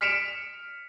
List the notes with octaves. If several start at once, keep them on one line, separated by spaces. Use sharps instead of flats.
F6 B6 C#7 D7 E7 F7